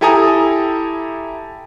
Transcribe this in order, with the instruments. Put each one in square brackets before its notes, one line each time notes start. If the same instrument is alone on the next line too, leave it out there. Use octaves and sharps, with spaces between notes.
[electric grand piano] E4 G4 A4 G#5 A#5 D#6